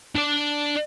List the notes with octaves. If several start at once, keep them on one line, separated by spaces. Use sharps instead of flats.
D4 D5